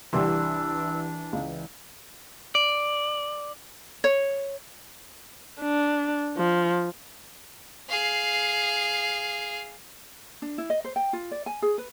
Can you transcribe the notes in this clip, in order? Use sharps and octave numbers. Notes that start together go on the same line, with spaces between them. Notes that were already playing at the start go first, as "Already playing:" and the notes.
C2 E3 G3 D4 C6 E6
C#2 D5
D5
C#5
D4
F3
G#4 F5
D4
E4
D#5
C5
G5
F4
D5
G#5
G#4
B4